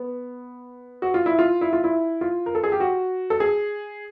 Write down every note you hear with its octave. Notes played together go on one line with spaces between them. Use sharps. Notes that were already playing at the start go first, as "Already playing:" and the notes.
Already playing: B3
F#4
F4
E4
F4
E4
F4
E4
F4
A#4
A4
G#4
G4
F#4
A4
G#4